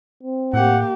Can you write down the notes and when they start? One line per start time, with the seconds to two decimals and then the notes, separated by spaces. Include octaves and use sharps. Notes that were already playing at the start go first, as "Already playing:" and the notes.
0.23 C4
0.54 A2 A#3 G4 F#5